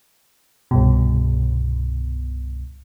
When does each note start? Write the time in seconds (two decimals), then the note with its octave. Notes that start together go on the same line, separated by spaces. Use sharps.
0.71 C2 G2 B2